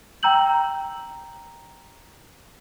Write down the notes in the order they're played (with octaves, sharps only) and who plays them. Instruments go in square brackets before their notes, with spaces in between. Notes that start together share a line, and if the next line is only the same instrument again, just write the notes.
[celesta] G5 A#5 E6 G6 F#7